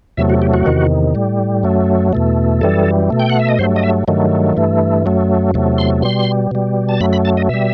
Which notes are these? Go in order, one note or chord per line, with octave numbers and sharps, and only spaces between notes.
E2 C3 F#3 A3 E5
F#4
G4
F#4
E2 C3 D#3
A2 G3
F#2 F#3 A3
E2 B2 A3
F#2 E3 G3 A4
B2 A3
G5
F#5
E5
D#5
G2 F#3 A3 C5
D#5
E5
G2 D#3 F#3 A3
G2 E3 A3
F#2 F#3 A3
E2 C3 F#3 A3
C6
B2 G3 C6
B2 G3
A5
F#2 F#3 A3 B5
B5
A5
D#5
B2 G3 E5